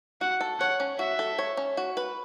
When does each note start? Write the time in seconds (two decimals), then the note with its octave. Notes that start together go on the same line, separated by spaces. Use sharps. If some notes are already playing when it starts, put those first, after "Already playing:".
0.21 F#4 F#5
0.41 A4
0.60 C#5 F#5
0.80 C#4
0.99 F#4 E5
1.19 A4
1.39 C#5
1.57 C#4
1.77 F#4
1.97 B4